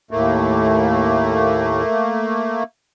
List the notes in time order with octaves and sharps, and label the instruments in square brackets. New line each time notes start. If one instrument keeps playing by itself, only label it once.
[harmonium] D#2 A2 [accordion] A3 A#3